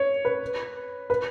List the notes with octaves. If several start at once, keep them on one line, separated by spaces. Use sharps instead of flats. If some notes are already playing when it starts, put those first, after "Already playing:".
Already playing: C#5
B4
B4